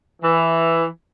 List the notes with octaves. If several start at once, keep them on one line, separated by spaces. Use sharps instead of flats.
E3